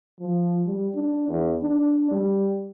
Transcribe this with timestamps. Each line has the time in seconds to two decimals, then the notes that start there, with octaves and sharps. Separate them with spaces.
0.20 F3
0.67 G3
0.96 D4
1.28 E2
1.63 D4
2.11 G3